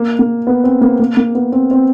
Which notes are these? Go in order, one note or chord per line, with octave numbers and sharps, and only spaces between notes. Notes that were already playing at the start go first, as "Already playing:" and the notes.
Already playing: A#3
A#3
B3
C4
A#3
A#3
A#3
B3
C4
C4